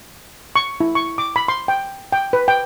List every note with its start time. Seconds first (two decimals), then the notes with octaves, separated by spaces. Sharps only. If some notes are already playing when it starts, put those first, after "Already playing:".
0.56 C#6
0.80 E4
0.95 C#6
1.18 D6
1.36 B5
1.48 C6
1.68 G5
2.12 G5
2.33 B4
2.48 G5